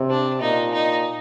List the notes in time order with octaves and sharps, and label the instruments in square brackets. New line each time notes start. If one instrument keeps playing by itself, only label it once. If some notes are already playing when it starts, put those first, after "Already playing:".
Already playing: [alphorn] C3
[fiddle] D4
[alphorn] A#2 [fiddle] D#4
[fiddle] D#4